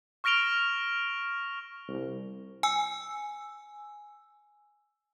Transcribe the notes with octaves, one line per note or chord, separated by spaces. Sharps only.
C#6 F6 A#6 D7 F7 G7
C2
G#5 E6